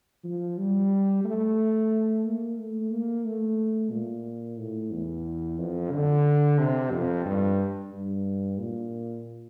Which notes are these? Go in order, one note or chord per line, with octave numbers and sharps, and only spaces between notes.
F3
G3
A3
A#3
A3
A#3
A3
A#2
A2
E2
F2
D3
C3
F2
G2
G2
A#2